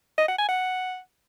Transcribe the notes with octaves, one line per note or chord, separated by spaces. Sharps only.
D#5
F#5
G#5
F#5